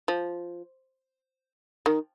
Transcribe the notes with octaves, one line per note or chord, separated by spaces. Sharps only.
F3
D#3